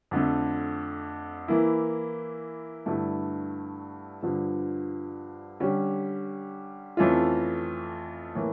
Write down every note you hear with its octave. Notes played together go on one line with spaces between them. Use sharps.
F2 D3 A3
E3 A#3 E4
G2 D3 A3 E4
G2 D3 F3
D3 G3 C#4
F2 E3 A3 C#4 F4
A2 E3 A#3